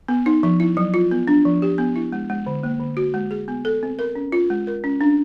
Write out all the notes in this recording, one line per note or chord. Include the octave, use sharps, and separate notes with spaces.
B3
D#4
F3
E4
F#3
F4
B3
D4
F3
G4
B3
E4
G#3
G#3
D3
A#3
D3
F#4
G#3
G#4
B3
A4
C4
A#4
C#4
F4
G#3
A#4
C#4
D4